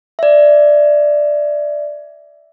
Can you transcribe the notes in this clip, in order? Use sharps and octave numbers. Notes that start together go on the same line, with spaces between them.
D5 E5